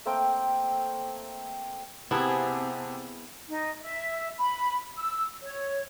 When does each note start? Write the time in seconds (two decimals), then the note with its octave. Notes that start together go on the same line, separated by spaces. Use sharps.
0.06 A3 A#3 C4 G5
2.11 C3 B3 C4 E4 G4 G#4 A5
3.48 D#4
3.82 E5
4.39 B5
4.98 E6
5.43 C#5